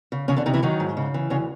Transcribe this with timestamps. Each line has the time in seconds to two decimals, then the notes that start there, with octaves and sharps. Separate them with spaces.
0.12 C#3
0.28 E2 C#3 C#4
0.36 D3 D4
0.46 C3 D#3 D#4
0.54 E3 E4
0.62 D#3 F#3 D#4
0.80 G#2
0.97 C#3
1.14 E3
1.30 D2 C#3 C#4